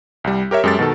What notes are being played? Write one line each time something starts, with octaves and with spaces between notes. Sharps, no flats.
C2 G3
G4 A#4 C#5 E5
F#2 G#3 G4 A4 A6
B2 D#3 A4